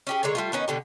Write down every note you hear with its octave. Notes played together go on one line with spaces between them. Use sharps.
C#4 G4 G#4
D3 G#3 A#3 C#5
G3 A3 F4
D#3 B3 C#4 D#4
B2 D3 G4